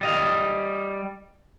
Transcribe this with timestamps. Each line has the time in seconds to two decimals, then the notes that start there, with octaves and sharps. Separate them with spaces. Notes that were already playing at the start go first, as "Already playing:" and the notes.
0.01 G3 D#5 F5